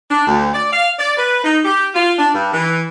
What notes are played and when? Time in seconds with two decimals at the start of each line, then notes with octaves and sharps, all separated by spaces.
0.10 D4
0.27 D2
0.54 D5
0.72 F5
0.99 D5
1.17 B4
1.44 D#4
1.65 G4
1.94 F4
2.17 D4
2.34 G2
2.52 E3